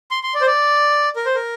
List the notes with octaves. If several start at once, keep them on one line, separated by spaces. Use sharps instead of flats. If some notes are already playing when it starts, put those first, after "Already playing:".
C6
C6
D5
C5
D5
A#4
C5
A#4